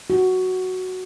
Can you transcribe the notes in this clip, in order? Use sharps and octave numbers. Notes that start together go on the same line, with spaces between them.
F#4